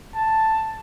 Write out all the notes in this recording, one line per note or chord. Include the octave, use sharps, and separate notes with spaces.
A5